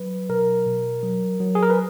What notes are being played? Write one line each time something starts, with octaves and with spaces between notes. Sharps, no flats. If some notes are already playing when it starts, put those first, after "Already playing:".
Already playing: F#3 B4
B2 A#4
B2
F#3
F#3
G#4
A#4
B4